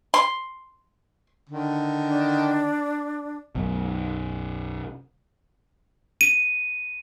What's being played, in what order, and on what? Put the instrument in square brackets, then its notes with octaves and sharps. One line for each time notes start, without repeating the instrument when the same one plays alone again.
[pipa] C6
[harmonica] D3 D#3
[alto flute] D4
[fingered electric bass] B1 F#2
[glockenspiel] D#7